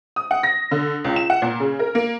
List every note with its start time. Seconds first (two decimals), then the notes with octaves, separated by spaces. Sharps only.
0.16 D#6
0.31 F#5
0.43 A#6
0.71 D3
1.04 C#2
1.16 E7
1.30 F#5
1.42 A#2
1.60 C#3
1.79 A#4
1.95 A#3